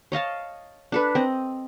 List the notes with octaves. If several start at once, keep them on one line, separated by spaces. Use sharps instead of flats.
C#5 D#5 F5 A5
D4 A4 B4
C4 D#5